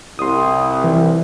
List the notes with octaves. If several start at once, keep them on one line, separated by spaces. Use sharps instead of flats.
C2 C6 D#6
E3